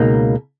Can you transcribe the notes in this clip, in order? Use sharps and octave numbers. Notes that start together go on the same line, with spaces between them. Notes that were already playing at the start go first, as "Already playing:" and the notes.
Already playing: C#2 B2 A#3 D#4